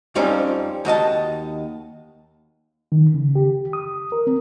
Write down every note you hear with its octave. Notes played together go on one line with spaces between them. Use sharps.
F2 F3 G3 C4 C#4 D#4
D#2 F#4 D#5 A5
D#3
C#3
G4
D#6
A#4
C4